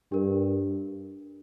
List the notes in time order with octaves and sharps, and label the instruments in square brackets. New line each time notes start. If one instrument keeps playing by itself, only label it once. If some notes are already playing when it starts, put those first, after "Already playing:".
[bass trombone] G2 [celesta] D4 G4 A#4